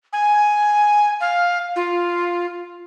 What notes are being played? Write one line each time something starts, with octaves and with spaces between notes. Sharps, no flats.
G#5
F5
F4